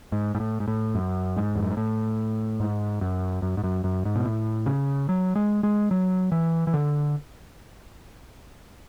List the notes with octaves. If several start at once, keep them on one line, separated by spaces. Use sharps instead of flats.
G#2
G#2
A2
G#2
A2
F#2
G#2
E2
F#2
G#2
A2
G#2
F#2
F#2
G#2
F#2
F#2
G#2
B2
A2
C#3
F#3
G#3
G#3
F#3
E3
E3
D3